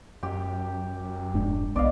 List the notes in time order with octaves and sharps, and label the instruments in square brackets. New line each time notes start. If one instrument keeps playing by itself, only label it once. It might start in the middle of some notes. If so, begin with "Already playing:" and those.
[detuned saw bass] F#2 [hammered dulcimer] G4
[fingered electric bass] F1 G#2 D4
[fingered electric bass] B1 [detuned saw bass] B3 [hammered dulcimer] D5 D#5 F5